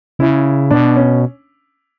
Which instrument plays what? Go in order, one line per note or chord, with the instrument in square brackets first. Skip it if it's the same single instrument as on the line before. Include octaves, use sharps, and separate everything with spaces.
[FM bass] C#3 [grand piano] E4
[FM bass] B2 [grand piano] D4
[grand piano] C#4